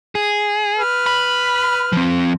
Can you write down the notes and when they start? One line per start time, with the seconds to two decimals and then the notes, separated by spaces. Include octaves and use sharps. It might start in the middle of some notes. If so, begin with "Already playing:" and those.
0.15 G#4
0.78 B4 F6
1.06 B5
1.92 F3 C4